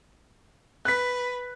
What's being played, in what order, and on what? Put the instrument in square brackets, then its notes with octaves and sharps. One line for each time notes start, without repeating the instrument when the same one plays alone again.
[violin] B4 [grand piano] F#6 B6